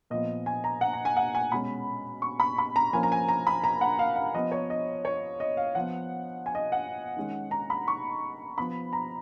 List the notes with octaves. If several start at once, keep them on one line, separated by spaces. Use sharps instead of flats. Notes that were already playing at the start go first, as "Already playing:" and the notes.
A#2 F3 B3 D#5
G#5
A#5
F#5
A#5
G#5
F#5
G#5
B2 G#3 C#4 B5
C#6
B5
B5
A#5
F3 A#3 C#4 G#5
A#5
G#5
A#5
B5
A#5
F#5
F5
F5
F3 B3 D#5
C#5
D#5
C#5
D#5
F5
F3 B3 F#5
G#5
D#5
F#5
D#3 G#3 C#4
A#5
B5
C#6
F3 B3 B5
A#5